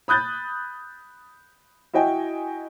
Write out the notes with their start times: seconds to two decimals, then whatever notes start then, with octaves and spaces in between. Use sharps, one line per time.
0.08 B5 D#6 F#6 G6 A6
1.93 E4 F#4 D#5 G5 G#5